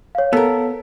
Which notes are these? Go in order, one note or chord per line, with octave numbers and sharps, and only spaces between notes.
C#5 F5
B3 A4 A#4